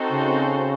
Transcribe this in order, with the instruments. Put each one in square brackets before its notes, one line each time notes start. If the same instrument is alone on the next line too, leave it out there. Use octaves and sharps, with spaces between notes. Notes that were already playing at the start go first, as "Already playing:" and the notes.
Already playing: [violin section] C4 D#4 F#4 A4 C5
[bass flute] C#3